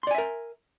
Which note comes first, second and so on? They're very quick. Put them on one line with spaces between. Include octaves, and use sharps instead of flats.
C6 D5 G#5 E5 A#4